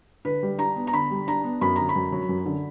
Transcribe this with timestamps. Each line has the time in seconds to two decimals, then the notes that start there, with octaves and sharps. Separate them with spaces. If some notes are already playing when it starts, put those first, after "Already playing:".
0.25 D3 B4
0.43 G3
0.58 D4 A#5
0.76 B3
0.87 A#5
0.93 D3 B5
1.11 G3
1.27 D4 A#5
1.44 B3
1.61 F#2 B5
1.76 D3 A#5
1.89 B5
1.96 F#2
2.12 F#3
2.29 F#2
2.46 D3